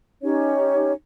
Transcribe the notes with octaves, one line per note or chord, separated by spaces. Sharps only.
C#4 D#4 G4 C#5